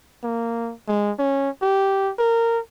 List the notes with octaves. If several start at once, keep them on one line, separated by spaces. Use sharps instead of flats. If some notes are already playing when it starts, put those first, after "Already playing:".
A#3
G#3
C#4
G4
A#4